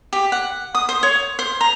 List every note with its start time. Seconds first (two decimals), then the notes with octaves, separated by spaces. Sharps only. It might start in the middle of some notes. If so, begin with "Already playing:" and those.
0.13 G4
0.32 F#5
0.75 D#6
0.89 C5
1.03 C#5
1.39 C5
1.61 A#5